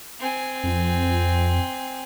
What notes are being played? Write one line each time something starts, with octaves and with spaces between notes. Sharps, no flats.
C4 G#5
F2